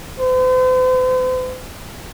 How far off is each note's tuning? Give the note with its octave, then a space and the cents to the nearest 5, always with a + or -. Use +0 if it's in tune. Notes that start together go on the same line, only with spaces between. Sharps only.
C5 -45